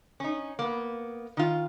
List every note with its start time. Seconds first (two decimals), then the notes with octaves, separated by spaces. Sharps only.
0.20 C#4 D#4
0.59 A#3 B3
1.37 D#3 F4